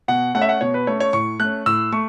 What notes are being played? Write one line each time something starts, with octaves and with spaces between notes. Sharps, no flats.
B2 F#5
A3 C#4 F#5
E5
F#5
B2 C#5
B4
A3 C#4 C#5
C#5
A2 C#6
A3 C#4 F#6
A2 E6
A3 C#6